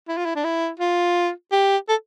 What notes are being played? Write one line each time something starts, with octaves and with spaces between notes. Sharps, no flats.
E4
F4
E4
D4
E4
F4
G4
A4